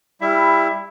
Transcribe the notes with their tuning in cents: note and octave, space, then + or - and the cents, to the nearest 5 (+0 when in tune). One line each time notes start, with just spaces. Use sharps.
G3 +20 E4 +0 E5 +20